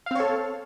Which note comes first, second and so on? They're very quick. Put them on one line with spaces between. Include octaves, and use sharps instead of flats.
F5 C4 C#5 A4